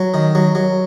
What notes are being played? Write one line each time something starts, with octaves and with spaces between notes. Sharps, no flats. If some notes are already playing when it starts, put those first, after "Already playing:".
Already playing: F#3
D#3
F#3
F#3